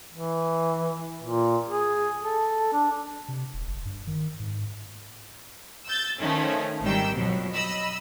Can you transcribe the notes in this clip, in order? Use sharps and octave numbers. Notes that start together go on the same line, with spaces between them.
E3
A#2
G#4
A4
D4
C3
D#1
G1
G2
D#3
G#2
E6 G6 A6
D#3 F3 A3 C#4
G#1 D#3 G3 G4 G5 E6
F2 B2 F3 F#3
D#5 B5 E6